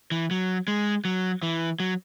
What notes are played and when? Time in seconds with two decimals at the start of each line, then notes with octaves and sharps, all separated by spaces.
0.12 E3
0.31 F#3
0.68 G#3
1.05 F#3
1.43 E3
1.80 F#3